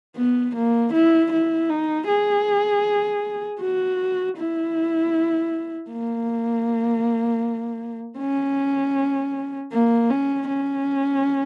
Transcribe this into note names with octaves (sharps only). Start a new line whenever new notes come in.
B3
A#3
E4
E4
D#4
G#4
F#4
E4
A#3
C#4
A#3
C#4
C#4